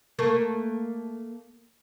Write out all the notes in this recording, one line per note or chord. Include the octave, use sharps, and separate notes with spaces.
A3 A#3 A#4